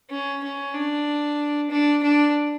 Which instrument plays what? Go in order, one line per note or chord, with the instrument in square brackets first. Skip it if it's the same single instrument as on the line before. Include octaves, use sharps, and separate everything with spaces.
[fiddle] C#4
C#4
D4
D4
D4